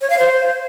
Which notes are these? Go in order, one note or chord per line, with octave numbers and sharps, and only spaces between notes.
C#5
F5
C5